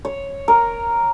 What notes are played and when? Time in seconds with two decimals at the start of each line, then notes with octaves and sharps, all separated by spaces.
0.05 C#5
0.48 A#4